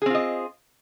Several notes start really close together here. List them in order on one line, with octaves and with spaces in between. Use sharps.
G#4 C4 F4 D#5